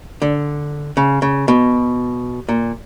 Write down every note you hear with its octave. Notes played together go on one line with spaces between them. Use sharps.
D3
C#3
C#3
B2
A#2